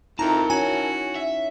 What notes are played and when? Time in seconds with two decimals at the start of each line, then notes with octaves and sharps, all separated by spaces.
0.19 F2 D#4 E4 A#4 A5 A#5
0.50 C#4 F#4 G#5
1.15 E5